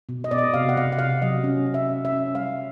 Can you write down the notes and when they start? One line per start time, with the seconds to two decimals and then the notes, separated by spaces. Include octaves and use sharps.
0.09 B2
0.24 D#5
0.31 B2 D5
0.38 D#5
0.54 C3 F5
0.69 F#5
0.77 C3 F5
0.92 F#5
0.99 C3 F5
1.22 F#3 D#5
1.44 C#4
1.66 C#4
1.74 E5
1.89 C#4
2.05 E5
2.12 C#4
2.35 G3 F5